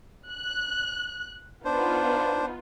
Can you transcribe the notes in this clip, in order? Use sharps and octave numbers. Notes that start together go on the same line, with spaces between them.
F#6
B3 D4 D#4 F4 C5